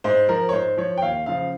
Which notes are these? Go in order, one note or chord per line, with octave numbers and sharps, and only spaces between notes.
G#2 C5
F3 A#4
C#5
G#2 C5
F3 C#5
G5
D#2 F5
C#3 F3 F5